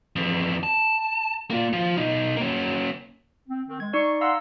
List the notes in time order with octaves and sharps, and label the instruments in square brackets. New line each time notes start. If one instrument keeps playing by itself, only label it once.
[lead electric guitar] F2 E3
A5
A#3 F4
F3 F4
B2 D#4
A#3 C#4
[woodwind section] C4
D#3 C4
[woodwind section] G#3 [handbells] G#6
[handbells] D#4 D5 [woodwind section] C#6
[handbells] F5 A#5 E6 [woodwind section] F#5 C6